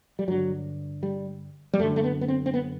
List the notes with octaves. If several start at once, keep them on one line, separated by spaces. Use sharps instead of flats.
G3
G2 D3 F#3
G3
G3
F#2 D3 A3
A3
B3
B3
C4
C4
B3